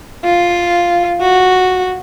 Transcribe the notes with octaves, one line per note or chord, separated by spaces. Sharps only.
F4
F#4